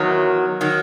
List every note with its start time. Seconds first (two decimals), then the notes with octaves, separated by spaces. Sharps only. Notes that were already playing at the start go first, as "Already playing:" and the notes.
Already playing: E2 D#3 F#3
0.61 D#3 F#3